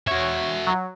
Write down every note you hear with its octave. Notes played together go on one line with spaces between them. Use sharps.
F#4 C#5 E5
F#3